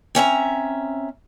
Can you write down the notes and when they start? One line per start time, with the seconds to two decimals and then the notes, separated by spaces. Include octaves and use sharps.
0.15 C4 C#4 E5 A#5